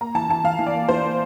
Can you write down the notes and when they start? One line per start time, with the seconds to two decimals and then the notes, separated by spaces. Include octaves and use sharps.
0.01 A#3 A#5
0.15 E3 A5
0.29 E3 A5
0.44 E3 F5
0.59 E3
0.67 D5
0.74 A#3
0.89 E3 C5
1.03 A#3